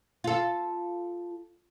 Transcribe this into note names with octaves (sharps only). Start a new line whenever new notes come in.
F4 A4